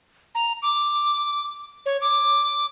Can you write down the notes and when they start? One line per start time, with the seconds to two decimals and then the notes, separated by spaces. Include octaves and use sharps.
0.35 A#5
0.62 D6
1.86 C#5
2.01 D6